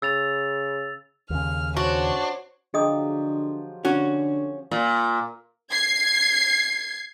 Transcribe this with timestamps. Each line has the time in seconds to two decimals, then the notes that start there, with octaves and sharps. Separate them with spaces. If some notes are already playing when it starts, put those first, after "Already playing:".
0.02 C#3 E6 A6 F7
1.30 D#2 C#3 F6
1.77 D4 F#4 C5 C#5
2.74 D3 F3 F#3 G4 G#4 D#5 D#6
3.85 D3 C#4 F#4
4.71 A#2
5.70 G#6 C7